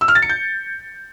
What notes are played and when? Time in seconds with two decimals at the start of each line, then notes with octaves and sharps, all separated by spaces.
0.01 E6
0.08 F6
0.15 A6
0.22 C#7
0.29 G6